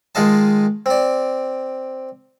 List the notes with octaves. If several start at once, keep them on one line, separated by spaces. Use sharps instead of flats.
D#3 G#3 F4 D#5 A5
C4 D5